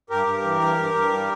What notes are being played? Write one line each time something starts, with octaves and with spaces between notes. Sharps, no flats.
G2 G4 A#4
G2
E3
G2
G2
G2
G3